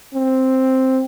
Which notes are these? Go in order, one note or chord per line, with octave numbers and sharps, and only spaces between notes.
C4